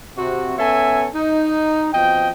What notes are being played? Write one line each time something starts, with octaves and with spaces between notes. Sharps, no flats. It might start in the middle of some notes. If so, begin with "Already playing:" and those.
C3 F#4
B3 C#4 A4 C#5 E5 G#5
D#4
B2 F3 C4 D#5 G5